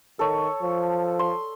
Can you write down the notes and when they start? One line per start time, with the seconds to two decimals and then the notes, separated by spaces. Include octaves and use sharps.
0.19 D#3 A4 C#5
0.62 F3
1.19 C6